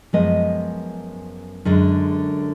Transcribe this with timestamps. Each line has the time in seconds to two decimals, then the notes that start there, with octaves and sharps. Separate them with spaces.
0.13 F#2 F3 G#3 B3 D#5
1.65 F#2 D3 G#3